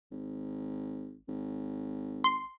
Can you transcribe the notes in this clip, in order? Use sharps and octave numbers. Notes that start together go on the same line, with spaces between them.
G#1
G#1
C6